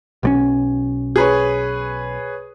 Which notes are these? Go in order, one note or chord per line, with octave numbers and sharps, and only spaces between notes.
B1 G3 C#4
G#4 B4 C#5